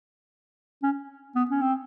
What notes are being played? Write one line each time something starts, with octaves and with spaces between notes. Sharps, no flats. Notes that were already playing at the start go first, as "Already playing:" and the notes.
C#4
B3
C#4
C4